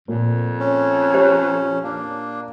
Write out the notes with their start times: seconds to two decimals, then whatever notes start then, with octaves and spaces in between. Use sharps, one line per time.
0.08 F2 A#2
0.60 C#4
1.14 G4 C5 C#5
1.83 A#3 D4